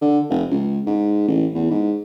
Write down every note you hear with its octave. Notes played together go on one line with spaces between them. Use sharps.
D3
F1
C#2
G#2
A1
E2
G#2